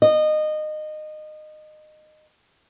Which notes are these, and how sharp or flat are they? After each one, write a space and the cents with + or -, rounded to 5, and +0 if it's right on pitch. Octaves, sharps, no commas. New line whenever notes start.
D#5 -20